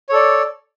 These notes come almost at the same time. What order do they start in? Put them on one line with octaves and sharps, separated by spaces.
C#5 A4 D5